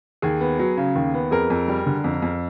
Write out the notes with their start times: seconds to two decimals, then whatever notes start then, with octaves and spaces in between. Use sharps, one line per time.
0.22 D#2 G#4
0.40 B3
0.59 F#3
0.77 C#3
0.95 D#2
1.14 B3
1.31 F2 G#4 A#4
1.50 F2
1.68 G3
1.86 D3
2.04 F2
2.22 F2